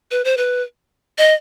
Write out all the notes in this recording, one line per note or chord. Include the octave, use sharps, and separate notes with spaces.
B4
C5
B4
D#5